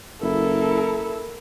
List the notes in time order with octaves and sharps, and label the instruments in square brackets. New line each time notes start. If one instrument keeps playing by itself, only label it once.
[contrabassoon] F#1 [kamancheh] E4 A4 [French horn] A#4